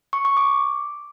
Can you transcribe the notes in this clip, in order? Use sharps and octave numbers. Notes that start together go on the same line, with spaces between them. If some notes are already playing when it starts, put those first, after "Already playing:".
C#6
C#6
D6